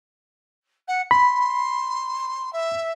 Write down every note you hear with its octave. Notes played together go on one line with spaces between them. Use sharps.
F#5
B5 C6
E5